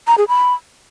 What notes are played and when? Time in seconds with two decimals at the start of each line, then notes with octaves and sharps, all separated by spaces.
0.07 A#5
0.18 G#4
0.28 B5